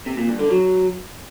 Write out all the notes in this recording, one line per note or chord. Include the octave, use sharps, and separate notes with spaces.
C3
A#2
G2
D3
F#3